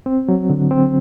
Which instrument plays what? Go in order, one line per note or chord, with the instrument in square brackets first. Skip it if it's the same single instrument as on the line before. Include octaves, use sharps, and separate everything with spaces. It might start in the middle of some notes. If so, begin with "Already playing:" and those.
[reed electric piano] C4
F#3
D3
C4